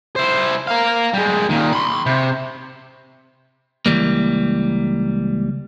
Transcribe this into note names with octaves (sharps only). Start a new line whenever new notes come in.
E4 C5
A#4 F5
G3 G#3
A#2 D#3
B5 C6
C3
C#2 E3 G3 A#3